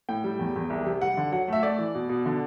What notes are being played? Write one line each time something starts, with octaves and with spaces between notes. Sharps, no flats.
A2 G5
G3
E2
E2
C2
C3
G3 F#5
D3
F#3 F#5
A3 E5
A3 D5
E3
B2
B2
D3